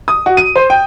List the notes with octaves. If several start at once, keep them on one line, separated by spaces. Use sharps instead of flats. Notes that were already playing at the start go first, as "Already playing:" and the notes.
D#6
F#4
D#7
C5
G5